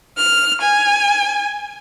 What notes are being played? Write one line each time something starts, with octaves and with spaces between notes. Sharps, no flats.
F6
G#5